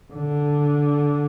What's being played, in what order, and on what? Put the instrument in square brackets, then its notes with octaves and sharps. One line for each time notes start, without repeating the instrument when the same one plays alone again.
[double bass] D3